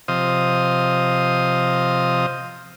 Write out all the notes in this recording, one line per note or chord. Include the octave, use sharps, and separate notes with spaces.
C3 F3 C5 D#5 F5 D#6